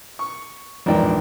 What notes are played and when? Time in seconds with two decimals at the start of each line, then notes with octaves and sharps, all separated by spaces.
0.19 C#6
0.86 A#1 E2 G#2 D5 G5